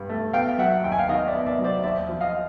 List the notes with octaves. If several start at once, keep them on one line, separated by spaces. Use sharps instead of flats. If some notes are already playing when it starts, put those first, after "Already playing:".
Already playing: G2
A3
B3 F5 G5
F#3 E5 F#5
D#2 G5
G#5
F5 G5
D#3 D#5 F5
D5 E5
B3
D5 E5
F#3
C5 D5
D#2 D5 E5
F3
D#5 F5